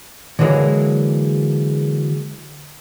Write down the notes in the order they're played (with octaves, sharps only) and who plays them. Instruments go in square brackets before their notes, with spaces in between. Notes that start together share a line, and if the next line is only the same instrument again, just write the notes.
[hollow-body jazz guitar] D3 E3 F#3 G#3 A#3 E4